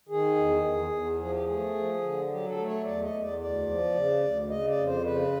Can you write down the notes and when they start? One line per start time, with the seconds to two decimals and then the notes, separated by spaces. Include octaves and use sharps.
0.09 D#3 G#4
0.36 E2
0.64 E2
0.91 E2
1.18 F3 G#4
1.31 G4
1.44 A3 G#4
1.74 F3
2.01 D3
2.28 F#3 G4
2.47 A4
2.57 A3
2.66 C#5
2.84 E2 D5
3.02 D#5
3.11 E2
3.21 D5
3.39 D2 D5
3.67 F3
3.94 C#3
4.22 D2
4.49 C#3 D#5
4.67 D5
4.77 F2
4.86 C5
5.03 C#3 B4